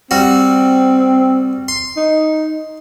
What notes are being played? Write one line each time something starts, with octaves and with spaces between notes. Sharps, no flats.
G3 C4 F#4
C6
D#4